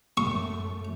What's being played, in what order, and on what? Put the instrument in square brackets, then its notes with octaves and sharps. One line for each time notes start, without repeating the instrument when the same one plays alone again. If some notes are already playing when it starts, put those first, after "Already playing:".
[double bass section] F#2 A3 [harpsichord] C#6